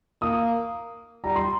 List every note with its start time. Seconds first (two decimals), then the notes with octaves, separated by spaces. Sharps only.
0.21 A#3 D#6
1.24 G3 A#5
1.36 C6